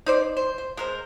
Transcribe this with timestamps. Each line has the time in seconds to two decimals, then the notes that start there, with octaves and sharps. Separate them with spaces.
0.06 D#4 C5 D5
0.37 C5
0.58 C5
0.77 G#3 A#4 C5